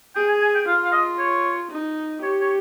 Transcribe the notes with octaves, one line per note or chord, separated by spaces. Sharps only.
G#4 G5
G#5
G#5
G5
F4 F5
F5
D#5
C#5
D#4
G4 C#5
C#5